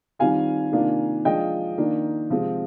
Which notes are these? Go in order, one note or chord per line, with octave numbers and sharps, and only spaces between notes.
D#3 G3 C4 F4 F5 G#5
C3 D#3 A#3 D4 F4
F3 G#3 D4 F4 D#5 G5
D#3 A#3 D4
C3 F3 G#3 C4